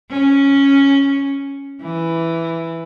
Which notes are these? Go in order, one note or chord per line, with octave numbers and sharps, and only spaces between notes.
C#4
E3